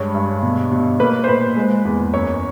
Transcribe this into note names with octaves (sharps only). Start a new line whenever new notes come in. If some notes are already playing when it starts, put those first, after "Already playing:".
Already playing: G2 G#3 C#5
G2
B2
B2
A#3 B4
C5
A#2 B4
G#3
E2
F#2 C#5